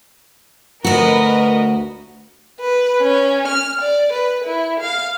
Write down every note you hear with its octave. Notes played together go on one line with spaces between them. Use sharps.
D2 F#4 A#4 B4 D#5
B4
C#4
F6
D5
B4
E4
F5